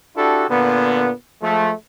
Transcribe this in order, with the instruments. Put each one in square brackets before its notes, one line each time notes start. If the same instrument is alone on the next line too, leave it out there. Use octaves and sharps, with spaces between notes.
[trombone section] D4 E4 F#4 G4 A4
A#2 D3 B3
F3 G#3 A3